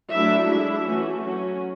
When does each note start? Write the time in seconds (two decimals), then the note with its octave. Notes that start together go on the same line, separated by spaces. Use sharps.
0.12 F#3 A3 D4 E4 E5
0.49 G#3 D4 E4 E5
0.86 E3 A3 C#4 F#4
1.22 F#3 C#4 F#4